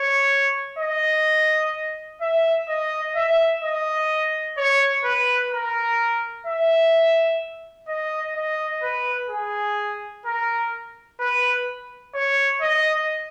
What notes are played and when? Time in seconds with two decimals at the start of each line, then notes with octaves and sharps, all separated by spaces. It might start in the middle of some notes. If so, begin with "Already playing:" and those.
Already playing: C#5
0.79 D#5
2.21 E5
2.68 D#5
3.15 E5
3.63 D#5
4.58 C#5
5.04 B4
5.52 A#4
6.46 E5
7.88 D#5
8.35 D#5
8.83 B4
9.30 G#4
10.25 A#4
11.20 B4
12.15 C#5
12.61 D#5